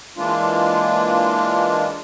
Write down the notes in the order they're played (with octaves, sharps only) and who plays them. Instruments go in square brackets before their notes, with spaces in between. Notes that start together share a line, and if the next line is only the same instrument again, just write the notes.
[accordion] E3 G#3 A#3 D4 F4